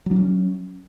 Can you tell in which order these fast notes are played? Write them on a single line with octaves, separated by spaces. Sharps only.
F#3 D4 C#4